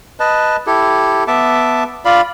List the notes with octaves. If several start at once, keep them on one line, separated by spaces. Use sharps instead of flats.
B4 D#5 A5
E4 G4 A4
B3 E5 A5 D6
F4 D5 F5 B5